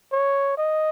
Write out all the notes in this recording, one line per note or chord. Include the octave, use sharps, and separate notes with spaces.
C#5
D#5